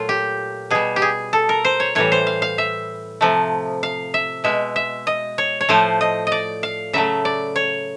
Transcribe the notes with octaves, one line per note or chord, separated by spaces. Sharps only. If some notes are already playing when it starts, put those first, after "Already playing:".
Already playing: A#2 F#3 A3 F4
G4
B2 G3 G#4
G4
G#4
A4
A#4
C5
C#5
A2 E3 G3 C#5
C5
F5
F5
E5
C3 F3 A3
F5
E5
B2 G#3 E5
E5
D#5
C#5
C#5
A2 F3 A3 C5
D#5
D5 D#5
F5
C#3 F#3 A3 E5
D5
C#5